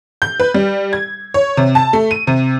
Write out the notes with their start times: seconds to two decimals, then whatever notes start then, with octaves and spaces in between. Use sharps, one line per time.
0.22 G6
0.40 B4
0.54 G3
0.93 G#6
1.34 C#5
1.57 C3
1.75 A5
1.93 A3
2.11 D#7
2.27 C3